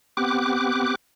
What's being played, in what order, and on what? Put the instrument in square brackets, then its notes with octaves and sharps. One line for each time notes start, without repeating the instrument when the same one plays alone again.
[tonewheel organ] B3 C4 G4 D6 F#6